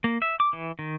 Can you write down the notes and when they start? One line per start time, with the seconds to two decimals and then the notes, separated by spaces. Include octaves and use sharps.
0.04 A#3
0.22 E5
0.40 D6
0.53 E3
0.79 D#3